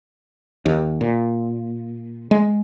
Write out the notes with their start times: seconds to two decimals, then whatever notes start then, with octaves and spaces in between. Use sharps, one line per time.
0.66 D#2
1.01 A#2
2.31 G#3